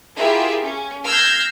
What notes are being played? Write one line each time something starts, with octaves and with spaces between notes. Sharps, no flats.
E4 F4 G4 G#4 A#4 E5
C#4
E6 F6 G6 G#6 A#6 C7